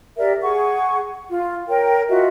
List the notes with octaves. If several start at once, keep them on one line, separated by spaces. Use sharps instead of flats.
G4 A#4 D5 E5
G#4 F#5 C#6
F4
A#4 C#5 G5
F4 F#4 D#5 E5